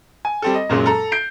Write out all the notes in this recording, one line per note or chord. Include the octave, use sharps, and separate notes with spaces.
G#5
G3 C4 A4
D#5
F#2 A#2 F#3 G#3
A4 A#5
G6 C7 D7